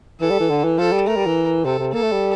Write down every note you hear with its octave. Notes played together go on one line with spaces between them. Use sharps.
E3 A4
G3
E3
D3
E3
F3 A4
G3
A3 A#4
G3
E3
C3 A4
C3
A#3 A4
A3
G3